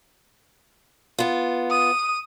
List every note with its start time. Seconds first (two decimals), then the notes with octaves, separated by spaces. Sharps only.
1.18 B3 F4
1.70 D#6